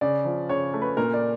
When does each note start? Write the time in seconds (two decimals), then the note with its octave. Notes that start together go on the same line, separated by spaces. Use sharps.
0.01 C#3 D5
0.25 F3
0.49 C#3 C#5
0.74 A3
0.82 B4
0.97 A#2 A#4
1.14 D5